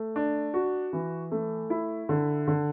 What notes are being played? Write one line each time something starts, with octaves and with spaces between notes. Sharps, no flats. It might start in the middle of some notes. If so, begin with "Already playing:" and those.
Already playing: A3
D4
F#4
E3
A3
E4
D3
D3